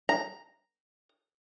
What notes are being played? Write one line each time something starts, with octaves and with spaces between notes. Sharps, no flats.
A#5